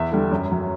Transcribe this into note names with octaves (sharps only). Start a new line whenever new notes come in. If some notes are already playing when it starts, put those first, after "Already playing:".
Already playing: E2 E5
D3 G3
F#2
F#3